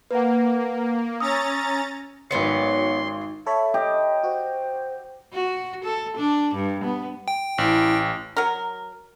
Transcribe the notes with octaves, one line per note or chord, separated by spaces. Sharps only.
A#3 B4 F#5
C#4 A#5 D#6 E6 A6
G#1 F#3 B3 C#4 C6 C#7
A4 C#5 E5 B5
G4 D#5
F#4 C5
F#4
A4
D4
G2
B3
G5
A1 E4
F#3 A#4